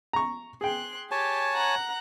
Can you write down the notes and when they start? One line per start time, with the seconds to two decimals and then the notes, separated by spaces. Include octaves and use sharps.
0.13 A#5 C#6
0.61 G#4 G5 C6 F#6
1.11 G4 C#5 G#5 A5
1.52 F#5 A#5 F#6